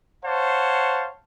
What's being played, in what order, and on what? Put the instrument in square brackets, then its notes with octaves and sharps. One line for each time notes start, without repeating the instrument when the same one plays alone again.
[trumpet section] C5 C#5 F5 F#5 A5